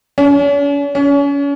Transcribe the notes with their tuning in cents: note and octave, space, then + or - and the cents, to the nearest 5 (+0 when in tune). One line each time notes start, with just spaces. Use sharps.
C#4 +45
C#4 +35